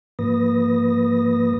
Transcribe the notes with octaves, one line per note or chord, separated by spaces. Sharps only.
G#2 F3 A#3 B4 D#6 A#6